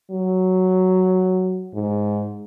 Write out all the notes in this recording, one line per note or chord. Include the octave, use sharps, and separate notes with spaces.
F#3
G#2